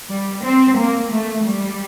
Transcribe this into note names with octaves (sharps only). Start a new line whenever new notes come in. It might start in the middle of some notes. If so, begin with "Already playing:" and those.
G3
C4
A#3
A3
G3